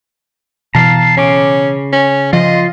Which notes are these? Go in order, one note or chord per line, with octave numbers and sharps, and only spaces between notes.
B2 E3 F5 A5 A#5
C#3 C#4 D6
C#4
C#3 F3 F4 D#5 C6